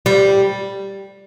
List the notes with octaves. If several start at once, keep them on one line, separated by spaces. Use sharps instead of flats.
G3